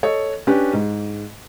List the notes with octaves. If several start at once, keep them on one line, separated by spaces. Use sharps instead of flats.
A4 C#5 D#5
C#4 D4 G4 B4
G#2